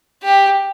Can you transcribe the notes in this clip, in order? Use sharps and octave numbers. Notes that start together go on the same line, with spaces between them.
G4